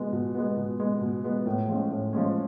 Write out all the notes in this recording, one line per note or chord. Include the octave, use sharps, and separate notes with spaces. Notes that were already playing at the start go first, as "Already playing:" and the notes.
Already playing: B2 G#3 B3
B2
G#3 B3
B2
G#3 B3
B2
G#3 B3
A2
F3 G#3 C#4
A2
F3 G#3 C#4